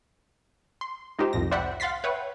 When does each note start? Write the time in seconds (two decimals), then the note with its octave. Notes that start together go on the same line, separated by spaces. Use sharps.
0.81 C6
1.19 G#3 D#4 F4 G4 C5
1.33 C2 F2 A2 A#6
1.52 C5 D5 E5 F#5 G5 B5
1.80 F5 F#5 C6 A6 B6 C7
2.04 B4 C#5 E5 F#5 G5